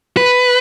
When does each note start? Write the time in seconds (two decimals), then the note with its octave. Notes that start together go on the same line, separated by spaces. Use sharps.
0.17 B4